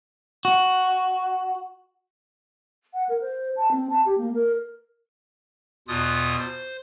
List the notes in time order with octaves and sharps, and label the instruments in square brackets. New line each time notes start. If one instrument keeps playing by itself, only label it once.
[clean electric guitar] F#4
[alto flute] F#5
A#4
C5
A5
C4
A5
G4
A#3
A#4
[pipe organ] E2 B2 F4 D#6
C5